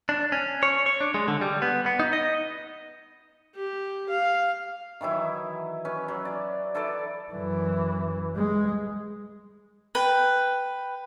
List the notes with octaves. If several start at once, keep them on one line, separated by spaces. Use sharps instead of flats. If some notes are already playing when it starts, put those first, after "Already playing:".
D4
C#4
C#5
C#5
D4
G#3
D3
G3
B3
B3
D#4
D#5
G4
F5
D#3 E3 F#3 E4
C#4 B4
F#3
D5
E4 A4 B4 D5
F#2 E3
G#3
B4 G5